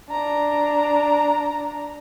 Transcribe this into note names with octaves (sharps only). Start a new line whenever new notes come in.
D4 A#5